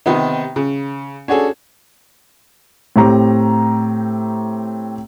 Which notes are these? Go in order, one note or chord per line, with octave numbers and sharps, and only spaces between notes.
C3 D#3 B3 D#4
C#3
C#4 D4 F#4 G#4 A4
A2 C4 G4 A#5